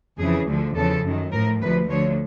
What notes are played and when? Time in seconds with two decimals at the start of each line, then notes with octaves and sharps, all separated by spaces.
0.18 F2 C#3 E3 G#4
0.46 D2 D3 F3
0.75 E2 C#3 F3 A4
1.04 F#2 D#3
1.32 A2 F3 A#4
1.61 D2 C3 F3 B4
1.88 D2 D3 F3 C#5